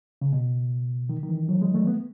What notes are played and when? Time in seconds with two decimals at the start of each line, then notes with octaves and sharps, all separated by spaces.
0.22 C#3
0.33 B2
1.09 D#3
1.23 D#3
1.29 E3
1.49 F#3
1.61 G#3
1.74 A3
1.87 B3